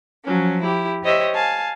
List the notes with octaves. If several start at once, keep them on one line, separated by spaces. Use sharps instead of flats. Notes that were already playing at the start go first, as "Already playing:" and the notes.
F3 F#3 C#4
E4 G4
G4 C5 C#5 D#5 E5
F5 G#5 A5